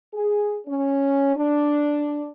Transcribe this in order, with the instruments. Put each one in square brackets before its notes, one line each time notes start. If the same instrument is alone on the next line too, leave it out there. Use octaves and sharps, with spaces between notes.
[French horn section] G#4
C#4
D4